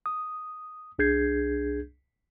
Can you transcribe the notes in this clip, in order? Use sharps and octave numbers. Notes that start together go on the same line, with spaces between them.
D#6
C2 D4 G#4 G6 G#6 C7